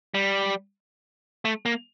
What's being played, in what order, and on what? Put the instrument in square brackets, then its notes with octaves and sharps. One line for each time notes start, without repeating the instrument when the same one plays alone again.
[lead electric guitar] G3
A3
A#3